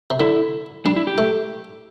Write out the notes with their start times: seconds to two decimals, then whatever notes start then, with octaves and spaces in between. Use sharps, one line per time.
0.10 C3
0.20 D3 E4
0.85 G3 D4
0.96 E4
1.07 G4
1.18 A3